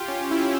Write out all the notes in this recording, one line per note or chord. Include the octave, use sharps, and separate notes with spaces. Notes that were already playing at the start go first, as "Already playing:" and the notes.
Already playing: F4 G4
C#4
E4
C#4